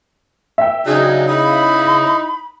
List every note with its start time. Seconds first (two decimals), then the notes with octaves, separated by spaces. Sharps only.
0.58 E5 G5
0.86 C#3 F#3 D4 D#4 G#4
1.28 D#4 E4 B5 D#6